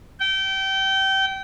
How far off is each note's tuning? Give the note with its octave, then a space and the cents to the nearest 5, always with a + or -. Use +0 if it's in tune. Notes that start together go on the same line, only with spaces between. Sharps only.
G5 -25